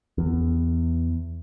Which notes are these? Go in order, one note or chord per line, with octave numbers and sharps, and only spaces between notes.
E2